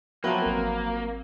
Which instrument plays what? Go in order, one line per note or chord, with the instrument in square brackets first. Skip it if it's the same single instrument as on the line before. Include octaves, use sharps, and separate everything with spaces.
[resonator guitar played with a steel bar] F3 B4 [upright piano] F#3 [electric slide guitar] A#3 [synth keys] B3 E5 G5
[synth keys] G#1 C4 A#4